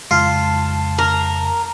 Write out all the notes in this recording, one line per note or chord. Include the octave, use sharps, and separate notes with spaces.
F2 C#3 G#3 F4 A5
A#4